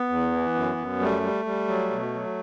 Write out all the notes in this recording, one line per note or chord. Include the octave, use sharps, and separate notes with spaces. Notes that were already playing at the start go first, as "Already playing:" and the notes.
Already playing: B3
E2
E3
F#2
F#2
G3 A3
G3
G3
F#3
B2
F#3